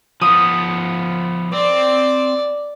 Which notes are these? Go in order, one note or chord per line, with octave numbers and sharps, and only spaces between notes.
F3 B3 D#6
C4 D5